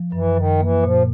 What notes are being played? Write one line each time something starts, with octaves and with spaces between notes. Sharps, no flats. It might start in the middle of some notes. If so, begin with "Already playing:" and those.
Already playing: F3
F#2 E3
F#2 D#3
E3 A#3
A#2 F3